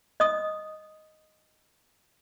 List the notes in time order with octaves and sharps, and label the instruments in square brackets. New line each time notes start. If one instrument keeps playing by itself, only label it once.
[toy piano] D#5 D#6